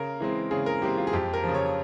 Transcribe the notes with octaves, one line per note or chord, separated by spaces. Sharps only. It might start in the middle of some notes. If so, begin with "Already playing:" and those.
Already playing: C#3 A#4
E3 G#3 C4
C#3 G#4
A#4
E3 G#3 C4 G4
F4
G#4
F2 G4
A#4
C#3 F3
C#5